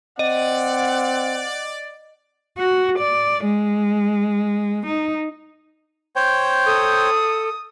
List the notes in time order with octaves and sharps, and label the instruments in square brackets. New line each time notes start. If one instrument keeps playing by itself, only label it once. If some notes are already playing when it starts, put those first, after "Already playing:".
[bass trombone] C4 [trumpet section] D5 [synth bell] D#5 [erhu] F#5
[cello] F#4
D5
G#3
D#4
[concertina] C5 C#5 G5
[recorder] A4 [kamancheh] D#6